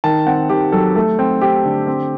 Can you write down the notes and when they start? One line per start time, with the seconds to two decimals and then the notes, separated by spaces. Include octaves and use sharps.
0.04 D#3 A5
0.27 C4 F#5
0.49 D#3 G4
0.72 F#3 A4
0.96 A3 A4
1.19 C4
1.41 C4 G4
1.65 D3
1.87 C4